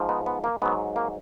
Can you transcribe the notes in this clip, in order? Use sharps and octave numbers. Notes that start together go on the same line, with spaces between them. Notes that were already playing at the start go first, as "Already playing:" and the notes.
Already playing: G#2 F3
B3 D#4
B3
A#3
G#2 F#3 B3
A#3